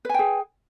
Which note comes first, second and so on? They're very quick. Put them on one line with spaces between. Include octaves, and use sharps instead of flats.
B4 G#5 G5 G#4